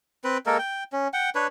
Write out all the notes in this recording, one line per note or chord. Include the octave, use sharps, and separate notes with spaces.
C4 B4
G#3 A#3 A4 A#4
G5
C#4
F#5 G5
D4 B4 C#5